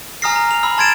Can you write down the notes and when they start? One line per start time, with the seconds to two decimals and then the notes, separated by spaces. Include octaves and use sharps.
0.22 G#5 A#5 D#6 F6 A#6 C7
0.36 A#5
0.51 F7
0.63 B5 E6
0.78 A5 C6 G#6 A6 D7 E7